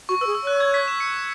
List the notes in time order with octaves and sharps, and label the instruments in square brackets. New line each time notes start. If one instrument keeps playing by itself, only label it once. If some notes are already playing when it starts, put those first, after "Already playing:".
[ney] F#4 [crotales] C#6
[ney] B4 [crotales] E6
[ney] G#4
[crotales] E6
[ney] C#5 [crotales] F#6
[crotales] G#6
B6
E7
C#7